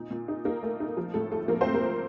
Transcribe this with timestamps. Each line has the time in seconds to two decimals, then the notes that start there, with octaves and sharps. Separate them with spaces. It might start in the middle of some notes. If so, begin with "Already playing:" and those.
Already playing: A#2 D#4
0.11 A#2
0.28 D#4
0.45 A#3 D#4 A#4
0.63 A3
0.80 D#4
0.97 F3
1.14 A2 A4
1.31 A3 A4
1.48 F3 A#3 A#4
1.61 C4 C5
1.65 A3
1.74 A#3 A#4
1.83 A3